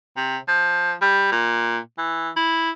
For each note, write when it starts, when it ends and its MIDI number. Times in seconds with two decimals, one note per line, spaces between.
0.17 0.38 48
0.48 0.94 53
1.02 1.28 55
1.32 1.78 46
1.98 2.30 52
2.36 2.71 64